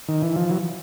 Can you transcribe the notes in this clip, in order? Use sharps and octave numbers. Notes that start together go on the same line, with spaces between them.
D#3
E3
F3
E3 F#3